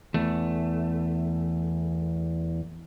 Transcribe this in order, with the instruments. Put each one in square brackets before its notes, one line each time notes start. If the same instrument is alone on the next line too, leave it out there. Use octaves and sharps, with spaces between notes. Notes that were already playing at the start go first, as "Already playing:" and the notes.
[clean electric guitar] E2 A3